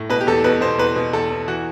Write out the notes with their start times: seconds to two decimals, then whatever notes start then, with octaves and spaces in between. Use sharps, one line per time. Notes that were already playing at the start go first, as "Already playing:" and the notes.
Already playing: A2
0.10 B2 B4
0.21 G4
0.27 E2 A4
0.44 B2 B4
0.61 B2 C5
0.78 E2 B4
0.96 B2
1.13 E2 A4
1.30 E2
1.47 E3 F#4